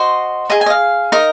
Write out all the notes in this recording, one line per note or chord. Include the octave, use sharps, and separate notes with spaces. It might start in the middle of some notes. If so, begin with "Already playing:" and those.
Already playing: F#4 C5 D#5 C6
G#4 D#5 A#5
G#5
D#5
F5
D#4 A#4 D#5